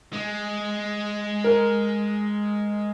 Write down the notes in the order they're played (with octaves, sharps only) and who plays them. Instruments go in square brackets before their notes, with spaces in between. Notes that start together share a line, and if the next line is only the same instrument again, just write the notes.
[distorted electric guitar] G#3
[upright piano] A#4